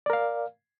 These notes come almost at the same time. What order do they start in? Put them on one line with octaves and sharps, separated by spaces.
D5 A#4 F5